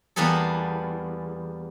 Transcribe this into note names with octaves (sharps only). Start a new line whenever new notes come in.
E2 G3 A#3 B3 G#4 A4